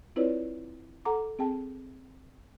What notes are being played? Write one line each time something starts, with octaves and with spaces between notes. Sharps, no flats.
C4 E4 F4 B4 C#5 D5
A4 F#5 A#5 D6
C4 G#4 G5 A5